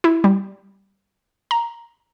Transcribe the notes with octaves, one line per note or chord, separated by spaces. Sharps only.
E4
G3
A#5